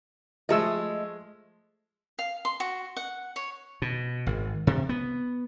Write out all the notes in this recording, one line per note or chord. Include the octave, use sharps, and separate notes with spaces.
F3 G#3 A3 D#5 E6
F5
C6
F#4
F#5
C#5
B2
G#1
C3
B3